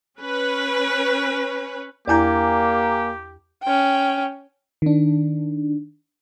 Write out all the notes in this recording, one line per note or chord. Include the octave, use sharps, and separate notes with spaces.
C#4 B4
E2 A#3 E4 G4 D5 G#5 A#5 G6
C#4 G5
D#3 D4